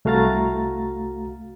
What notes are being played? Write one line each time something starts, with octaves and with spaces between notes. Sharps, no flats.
C2 A3 F#4 F5 A#5 A6